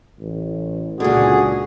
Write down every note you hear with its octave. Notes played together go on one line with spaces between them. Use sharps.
A1
C#2 A#2 D3 F#4 G#4